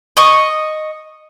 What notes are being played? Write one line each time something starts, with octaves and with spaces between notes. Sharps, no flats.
D#5 C#6